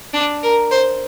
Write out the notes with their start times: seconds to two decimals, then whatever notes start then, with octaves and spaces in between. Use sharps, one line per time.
0.14 D4
0.43 A#4
0.71 C5